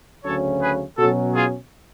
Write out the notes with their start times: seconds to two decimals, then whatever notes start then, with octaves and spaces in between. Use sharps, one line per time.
0.25 D2 C#3 F#3 C#4 A4 C#5
0.61 G#4 B4
0.97 B2 F#3 C#4 F#4 A4
1.34 F4 G#4